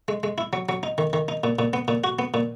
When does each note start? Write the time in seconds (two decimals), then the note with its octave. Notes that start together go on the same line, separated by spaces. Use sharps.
0.08 G#3
0.23 G#3
0.38 E4
0.53 F#3
0.69 F#3
0.83 D#4
0.98 D#3
1.13 D#3
1.28 D#4
1.44 A#2
1.59 A#2
1.73 B3
1.88 A#2
2.04 F#4
2.19 B3
2.34 A#2